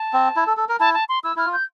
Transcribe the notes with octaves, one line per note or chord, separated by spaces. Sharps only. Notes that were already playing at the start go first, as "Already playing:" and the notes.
Already playing: A5
C4
E4
A4
A4
A#4
E4 A5
A5
C6
E4 E6
E4 F6
F4
G6